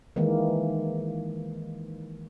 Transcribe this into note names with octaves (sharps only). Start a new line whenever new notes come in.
D#3 E3 G#3 A#3